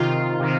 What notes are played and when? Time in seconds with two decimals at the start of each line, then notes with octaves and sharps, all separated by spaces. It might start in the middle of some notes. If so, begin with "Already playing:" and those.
Already playing: C3 D#3 F4
0.40 C3 D#3